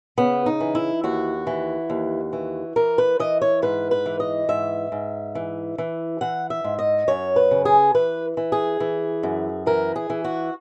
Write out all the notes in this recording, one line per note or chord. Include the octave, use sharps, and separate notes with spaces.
C#3 B3
D#4
E3
E4
D#2 F#4
E3
D#2
E3
E3 A#4
B4
E3 D#5
C#5
G#2 B4
B4
E3
D#5
G#2 E5
G#2
E3
E3
E3 F#5
E5
G#2
D#5
F#2 C#5
B4
C#3
G#4
E3 B4
E3
G#4
E3
F#2
E3 A#4
G#4
E3
F#4